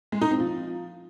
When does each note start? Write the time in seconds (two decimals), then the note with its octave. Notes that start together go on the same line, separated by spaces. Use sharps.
0.12 G#3
0.21 D#4
0.31 C4
0.40 F3